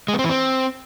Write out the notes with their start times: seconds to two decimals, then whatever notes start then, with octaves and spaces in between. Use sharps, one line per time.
0.08 G#3
0.14 B3
0.19 C4
0.24 E3
0.29 C4